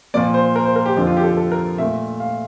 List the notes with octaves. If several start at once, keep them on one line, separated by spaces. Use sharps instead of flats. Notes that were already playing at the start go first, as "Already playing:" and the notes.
A#2 F3 A#3 D5
C5
A#4
C5
A#4
G4
F2 D3 F3
F4
G4
A4
G4
A4
A#4
A#2 A3 E5
F5